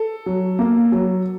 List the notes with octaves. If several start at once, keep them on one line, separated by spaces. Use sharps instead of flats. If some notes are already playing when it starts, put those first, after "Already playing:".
Already playing: A4
F#3
A#3
F#3